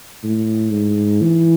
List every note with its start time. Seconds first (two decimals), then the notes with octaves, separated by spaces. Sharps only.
0.24 A2
0.72 G#2
1.22 E3